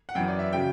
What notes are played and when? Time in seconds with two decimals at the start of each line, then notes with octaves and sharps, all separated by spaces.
0.09 F#5
0.15 F#2 E3 B3 G5
0.28 D5
0.39 E5
0.53 C#3 F#3 G5